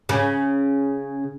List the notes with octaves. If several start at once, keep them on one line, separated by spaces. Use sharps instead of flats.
C#3